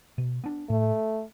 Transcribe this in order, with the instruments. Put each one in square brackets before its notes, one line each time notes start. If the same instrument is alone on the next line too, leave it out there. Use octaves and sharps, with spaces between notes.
[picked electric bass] B2
B3 D4
[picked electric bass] A2 [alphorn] A3